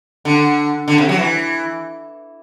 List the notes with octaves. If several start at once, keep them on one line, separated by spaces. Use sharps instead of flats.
D3
D3
C3
F#3
E3